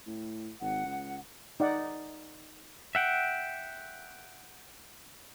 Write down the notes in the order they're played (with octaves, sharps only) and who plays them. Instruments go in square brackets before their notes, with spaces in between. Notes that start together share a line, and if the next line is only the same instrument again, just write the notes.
[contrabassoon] A2
[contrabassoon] G#1 [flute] F#5
[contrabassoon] C#2
[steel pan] D#4 D5 F#5
[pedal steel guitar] E5 F#5 G5